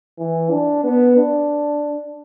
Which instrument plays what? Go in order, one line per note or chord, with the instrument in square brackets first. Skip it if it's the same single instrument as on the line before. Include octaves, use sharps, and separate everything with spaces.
[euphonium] E3
D4
B3
D4